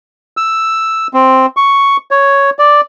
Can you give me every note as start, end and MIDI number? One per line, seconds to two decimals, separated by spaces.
0.37 1.07 88
1.14 1.46 60
1.57 1.97 85
2.11 2.50 73
2.59 2.81 74